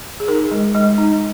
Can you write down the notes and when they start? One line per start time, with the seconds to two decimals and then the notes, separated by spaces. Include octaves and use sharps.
0.20 G#4
0.28 D#4 A#4
0.51 G#3
0.75 G#3
0.98 D#4